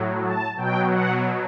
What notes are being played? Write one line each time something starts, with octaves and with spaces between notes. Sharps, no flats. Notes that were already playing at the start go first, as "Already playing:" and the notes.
Already playing: A2 F#3
A5
B2 F#3 G5
F#5